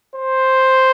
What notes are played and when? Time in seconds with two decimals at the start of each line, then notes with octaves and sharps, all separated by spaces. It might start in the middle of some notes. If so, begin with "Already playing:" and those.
0.16 C5